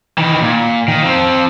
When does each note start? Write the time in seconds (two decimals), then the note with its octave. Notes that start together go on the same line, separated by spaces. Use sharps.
0.18 D#3 E3
0.42 A#2
0.88 D#3
1.02 F3 C4